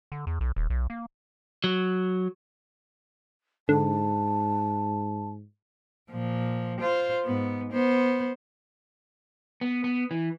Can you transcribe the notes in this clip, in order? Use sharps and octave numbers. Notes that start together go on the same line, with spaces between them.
D3
E2
B1
D#1
B1
A#3
F#3
G#2 D3 A5
A#2 F3
F4 C5
G#2 B3
B3 C5
B3
B3
E3